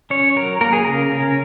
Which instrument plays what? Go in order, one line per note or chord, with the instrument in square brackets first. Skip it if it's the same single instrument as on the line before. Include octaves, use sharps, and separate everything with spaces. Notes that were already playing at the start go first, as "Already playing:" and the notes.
[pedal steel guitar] C#4 C#5
F#3 A#4
A#3 A#4
G#4
C#3 A#4
C#4